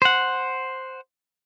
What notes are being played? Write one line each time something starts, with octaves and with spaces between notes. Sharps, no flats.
C5 F#5